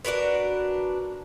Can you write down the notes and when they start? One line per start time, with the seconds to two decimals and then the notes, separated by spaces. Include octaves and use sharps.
0.05 D4 F#4 A#4 B4